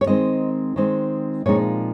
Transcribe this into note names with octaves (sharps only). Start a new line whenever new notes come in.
C#5
D#3 G#3 C4 D#4 D#5
D#3 G#3 C4 D#4
A#2 F3 G#3 C4 D#4 C#5